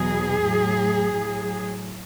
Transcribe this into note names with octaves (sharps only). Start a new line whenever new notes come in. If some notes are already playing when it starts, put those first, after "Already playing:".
Already playing: E2 B2 F#3 G#4
A2 F#3
A2 F#3